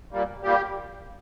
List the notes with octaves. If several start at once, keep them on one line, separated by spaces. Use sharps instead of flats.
A#2 G3 A#3
A#2 G3 A#3 G4